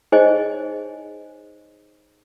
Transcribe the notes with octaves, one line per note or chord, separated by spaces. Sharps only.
D#4 G#4 C5 C#5 D#5 G#5